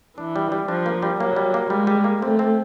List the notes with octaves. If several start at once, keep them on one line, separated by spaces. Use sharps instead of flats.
E3 D4
G3
G3
F3 D4
A#3
G3
F#3 A#3
G3
A#3
G3 G#3
G3
A#3
A3 C4
C4